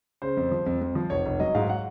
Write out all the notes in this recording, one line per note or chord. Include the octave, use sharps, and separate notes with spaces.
C#3 C5
F2
F3
F2
F2
F3
F1 C#5
F1
F#3 D#5
G#2 F5
F#5